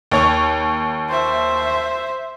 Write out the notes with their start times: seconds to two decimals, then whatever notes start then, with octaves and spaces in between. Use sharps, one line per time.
0.11 D#2 C#5 C#6
1.10 C5 E5